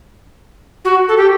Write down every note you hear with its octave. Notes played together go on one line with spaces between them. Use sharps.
F#4
A4
G4